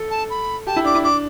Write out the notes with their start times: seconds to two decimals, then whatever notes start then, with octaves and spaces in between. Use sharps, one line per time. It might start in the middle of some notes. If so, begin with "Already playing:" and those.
Already playing: A4
0.11 A5
0.30 B5
0.67 G4 A5
0.76 E4
0.85 D4 D6
0.95 E4
1.04 D4 D6